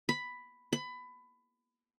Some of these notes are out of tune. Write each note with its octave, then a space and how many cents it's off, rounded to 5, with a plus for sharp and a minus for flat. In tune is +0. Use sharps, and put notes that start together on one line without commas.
B5 +5
B5 +20